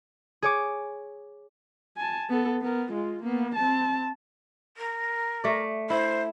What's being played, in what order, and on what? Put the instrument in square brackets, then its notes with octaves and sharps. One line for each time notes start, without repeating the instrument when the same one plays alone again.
[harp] G#4 C#5 D6
[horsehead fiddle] G#5 A5
B3 A4
B3 A#4
G#3 F4
A#3 B3
C4 A5
[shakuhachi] A#4
[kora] A3 D5
[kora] E4 [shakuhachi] C5